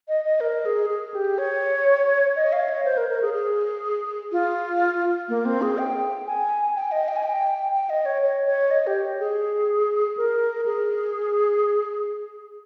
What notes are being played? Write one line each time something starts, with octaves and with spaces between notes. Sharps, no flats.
D#5
D#5
A#4
G#4
G#4
G4
C#5
D#5
F5
C#5
C5
A#4
A#4
G#4
G#4
F4
A#3
C4
G#4
G5
G#5
G5
D#5
G5
G#5
G5
G5
D#5
C#5
C#5
C#5
D#5
G4
G#4
A#4
G#4